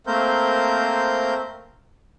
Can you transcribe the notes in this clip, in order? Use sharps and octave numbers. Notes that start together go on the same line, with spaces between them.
A3 A#3 C4 A#4 C5 G6